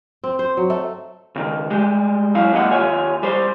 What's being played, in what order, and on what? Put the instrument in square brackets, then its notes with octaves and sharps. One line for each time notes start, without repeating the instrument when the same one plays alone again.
[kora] C4
C5
F#3
A3
[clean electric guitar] C#2 D#3
G3 G#3 G4
F#3 E4 F5
F#2 G3 G#3 A#3 D#5 F#5
D#2 F4 C#5 E5 G#5
G3 C5